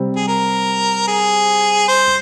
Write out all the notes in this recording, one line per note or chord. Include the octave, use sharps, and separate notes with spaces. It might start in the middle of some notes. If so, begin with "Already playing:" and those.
Already playing: C3 G3 C4
G#4
A#4
G#4
C5